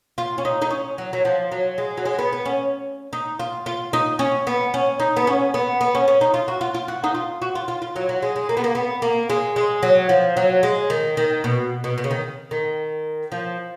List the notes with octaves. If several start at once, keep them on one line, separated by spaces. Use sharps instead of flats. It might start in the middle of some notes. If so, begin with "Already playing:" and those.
F4
C#4
D#4
D#4
C#4
F#3
F#3
F3
F#3
G#3
F#3
G#3
B3
B3
C#4
D#4
F4
F4
D#4
C#4
B3
C#4
D#4
B3
C#4
B3
B3
C#4
C#4
D#4
F4
F#4
F4
F4
F#4
D#4
F4
F#4
F4
F4
F4
F#3
F#3
G#3
G#3
A#3
B3
A#3
B3
A#3
G#3
G#3
F#3
F3
F#3
G#3
D#3
D#3
B2
B2
B2
C#3
D#3
D#3
F3